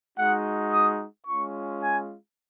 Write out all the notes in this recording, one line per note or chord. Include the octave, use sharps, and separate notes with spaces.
G#3 D#4 F#4 F#5
D#6
G#3 C#4 F4 C#6
G#5